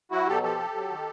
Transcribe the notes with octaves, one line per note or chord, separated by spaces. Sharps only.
F#3 E4 F#4
B2 G4 A4
F3 G4 A4
C3
F#3
D#3